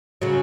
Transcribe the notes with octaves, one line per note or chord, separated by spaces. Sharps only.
C#3 F#3